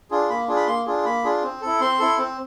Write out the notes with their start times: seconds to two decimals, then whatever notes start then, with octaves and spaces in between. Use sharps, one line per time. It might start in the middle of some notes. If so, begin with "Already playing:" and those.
0.11 D4 F4 G#4
0.30 A#3 B5
0.48 D4 F4 G#4
0.56 B5
0.67 A#3 C6
0.86 D4 F4 G#4
1.05 A#3 B5
1.24 D4 F4 G#4
1.43 C4
1.61 E4 A4
1.80 C4 C6
1.99 E4 A4
2.18 C4